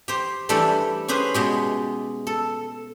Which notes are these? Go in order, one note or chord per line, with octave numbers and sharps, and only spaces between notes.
G4 C5
E3 G3 A3 D4 G4 A4
C#4 G4 G#4 B4 C5
B2 G#3 G4
A4